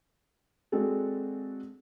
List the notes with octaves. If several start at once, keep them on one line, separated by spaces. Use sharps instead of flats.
G#3 C4 D4 F#4 G#4 A4